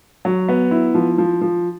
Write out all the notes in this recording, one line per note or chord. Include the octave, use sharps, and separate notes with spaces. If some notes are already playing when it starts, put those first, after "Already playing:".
F#3
B3
E4
F3
F3
F3